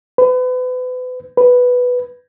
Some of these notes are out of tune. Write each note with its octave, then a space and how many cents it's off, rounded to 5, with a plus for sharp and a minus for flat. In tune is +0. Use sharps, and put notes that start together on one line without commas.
B4 +35
B4 +0